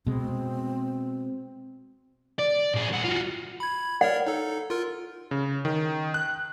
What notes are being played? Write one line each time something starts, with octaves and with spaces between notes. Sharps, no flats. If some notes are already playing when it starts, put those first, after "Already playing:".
B2 G#3 C4
D5
A#2 G#4
C2 F#5
F4 F#4
B5 G#6
A#4 C#5 D5 F#5
D#4 A4
F4 A#4
C#3
D#3
F#6